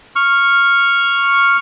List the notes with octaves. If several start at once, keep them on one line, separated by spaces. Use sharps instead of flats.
C#6 F6